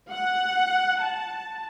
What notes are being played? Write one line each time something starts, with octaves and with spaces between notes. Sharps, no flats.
F#5
A5